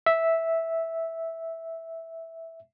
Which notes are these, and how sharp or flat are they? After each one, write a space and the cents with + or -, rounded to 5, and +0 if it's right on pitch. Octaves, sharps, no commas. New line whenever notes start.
E5 -5